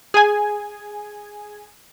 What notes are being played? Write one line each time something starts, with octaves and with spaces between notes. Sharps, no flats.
G#4 G#5